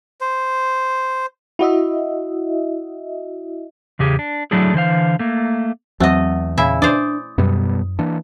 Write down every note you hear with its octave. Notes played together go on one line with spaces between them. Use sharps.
C5
E4 F#4 D#5 E5
E2 C#3 G4 G#4
D4
F#3 A3 D4 E4 G#4
D3 E3 C5 F5
A3 A#3
E2 F#3 A3 C4 D#5 F#5
A#2 C#3 E4 E5 G#5
D4 C5 D5 D#6
F#2 B2 G3 B3
E3 A#3 D4